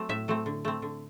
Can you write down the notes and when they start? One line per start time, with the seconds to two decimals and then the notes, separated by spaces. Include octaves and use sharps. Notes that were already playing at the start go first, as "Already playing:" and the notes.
Already playing: F#3 A3 C4
0.09 A2 E5
0.28 F#3 A3 C4
0.46 D3
0.65 A3 C4
0.82 D3